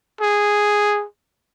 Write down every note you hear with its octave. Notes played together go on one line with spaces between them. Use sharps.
G#4